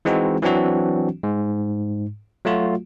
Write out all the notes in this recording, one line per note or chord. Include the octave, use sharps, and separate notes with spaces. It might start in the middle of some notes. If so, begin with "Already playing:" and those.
E3 G#3 C4 D#4 F#4
E3 F#3 C4 D4 F#4
G#2
F#3 A3 F4 F#4